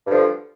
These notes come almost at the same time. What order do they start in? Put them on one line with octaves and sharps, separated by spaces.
G2 F3 D3